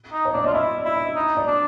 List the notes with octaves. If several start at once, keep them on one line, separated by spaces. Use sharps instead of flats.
D#4
C#5
D4 D5
F4 D#5
E4 E5
D#5
E4
D#5
D#4
D5
D4